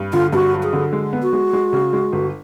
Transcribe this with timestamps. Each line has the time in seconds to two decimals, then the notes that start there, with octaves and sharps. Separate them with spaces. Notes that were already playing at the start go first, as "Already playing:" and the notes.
Already playing: G2
0.13 D3 F4
0.33 G2 F#4
0.53 F#3
0.63 G#4
0.73 D3
0.93 G#3
1.13 B3
1.22 F#4
1.33 G#3
1.53 G#3
1.73 C#3
1.93 G#3
2.12 G1